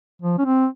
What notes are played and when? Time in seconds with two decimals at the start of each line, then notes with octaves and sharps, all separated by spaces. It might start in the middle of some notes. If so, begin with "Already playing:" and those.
0.22 F3
0.38 C#4
0.45 C4